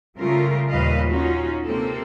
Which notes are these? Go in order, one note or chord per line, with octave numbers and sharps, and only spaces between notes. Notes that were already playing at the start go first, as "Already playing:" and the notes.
C#3 G3 A3 F4 A#4
D#2 A#2 G3 B4 D#5 F5
C#4 D#4 F4 F#4
C3 A#3 C4 A4